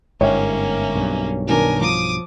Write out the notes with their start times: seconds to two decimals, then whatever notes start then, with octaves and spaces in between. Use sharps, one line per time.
0.21 G1 G#2 A#3 C#4 A#4 C#5 E5 G5
0.95 B1 G2
1.47 B2 D#3 D4 A#4 G#5
1.81 F3 D6 D#6